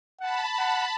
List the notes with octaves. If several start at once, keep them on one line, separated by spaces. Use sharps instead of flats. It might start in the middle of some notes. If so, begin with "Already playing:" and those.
F#5 A5 B5
F#5